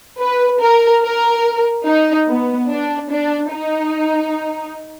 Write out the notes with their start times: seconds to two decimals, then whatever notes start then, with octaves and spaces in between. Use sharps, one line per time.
0.20 B4
0.61 A#4
1.03 A#4
1.86 D#4
2.28 B3
2.69 D4
3.11 D4
3.52 D#4